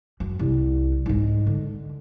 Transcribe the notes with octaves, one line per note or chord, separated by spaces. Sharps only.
F#2
C2
G#2 G#3
D3